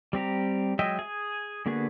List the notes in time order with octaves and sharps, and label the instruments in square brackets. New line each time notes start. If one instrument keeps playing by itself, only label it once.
[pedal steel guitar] G3 C4 G4 A#5
F#3 G#3 D#5 E5 G5
G#4 G#5
D3 A#3 B3 F#4 G#4